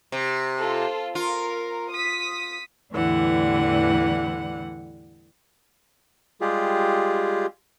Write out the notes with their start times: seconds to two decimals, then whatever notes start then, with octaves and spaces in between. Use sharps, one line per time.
0.12 C3
0.59 F4 A4
1.15 F4 A#4
1.92 D#6 B6
2.93 E2 A2 D3 E3 G3 F#5
6.41 G3 G#3 F4 G4 G#4